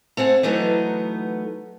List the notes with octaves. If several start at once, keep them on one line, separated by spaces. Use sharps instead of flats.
A3 C4 G#4 F#5
E3 F#3 A3 B3 D#4